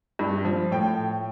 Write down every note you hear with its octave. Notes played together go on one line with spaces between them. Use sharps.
G2
F3
A2 G5